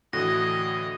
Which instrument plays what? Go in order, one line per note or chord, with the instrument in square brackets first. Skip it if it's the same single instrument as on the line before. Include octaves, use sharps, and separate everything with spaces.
[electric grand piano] A2 D3 E3 [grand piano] F#4 [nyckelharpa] D#5 [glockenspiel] A#6